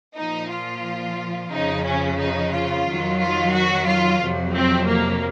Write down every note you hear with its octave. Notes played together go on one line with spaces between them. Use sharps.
A#2 F3 D#4
F4
F2 C#3 F3 D#4
C#4
D#4
F4
F2 D#3 F#3
F4
F#4
F4
F2 C3 F#3
C4
A#3